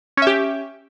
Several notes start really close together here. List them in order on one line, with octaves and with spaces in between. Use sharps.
C#4 E5 G4